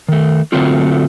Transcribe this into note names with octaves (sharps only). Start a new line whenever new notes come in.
D#3 A3
D3 F#3 A3 C4 F4